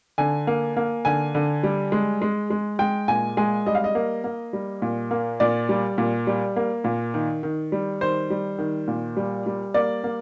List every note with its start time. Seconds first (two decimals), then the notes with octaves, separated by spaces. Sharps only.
0.18 D3 G#5
0.47 A#3
0.77 A#3
1.05 D3 G#5
1.35 D3
1.63 G3
1.92 G#3
2.22 G#3
2.50 G#3
2.79 G#3 G5
3.08 A#2 G#5
3.37 G#3 G#5
3.66 G3 D#5
3.75 F5
3.84 D#5
3.95 A#3
4.24 A#3
4.53 G3
4.82 A#2
5.11 A#3
5.40 A#2 D5
5.69 G3
5.98 A#2
6.27 G3
6.56 A#3
6.84 A#2
7.14 D#3
7.43 D#3
7.72 G3
8.01 D#3 C5
8.30 G3
8.59 D#3
8.88 A#2
9.17 G3
9.46 G3
9.74 A#3 D5
10.04 A#3